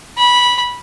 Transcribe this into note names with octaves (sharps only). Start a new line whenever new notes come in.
B5